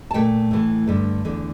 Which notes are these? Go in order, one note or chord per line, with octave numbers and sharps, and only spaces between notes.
A5
A#2 A3 G5
A2 E3 A3
G2 D3 A3
E2 D3 A3